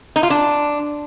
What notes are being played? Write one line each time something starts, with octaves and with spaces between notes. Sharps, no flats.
D#4
F4
D4